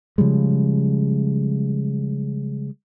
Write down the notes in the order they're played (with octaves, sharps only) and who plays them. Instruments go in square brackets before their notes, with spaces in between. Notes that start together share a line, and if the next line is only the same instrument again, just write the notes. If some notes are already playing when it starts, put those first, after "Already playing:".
[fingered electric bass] C#3 F3 G3 G#3